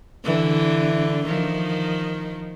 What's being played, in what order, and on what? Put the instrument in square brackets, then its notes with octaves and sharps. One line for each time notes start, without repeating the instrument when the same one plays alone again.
[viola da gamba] D3 E3
D#3 F3